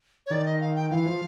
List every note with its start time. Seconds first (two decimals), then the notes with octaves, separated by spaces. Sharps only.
0.26 C#5
0.31 D#3 D5
0.45 D#5
0.60 F5
0.76 G5
0.91 E3 F5
1.06 F3